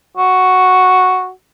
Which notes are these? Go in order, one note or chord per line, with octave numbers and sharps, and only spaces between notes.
F#4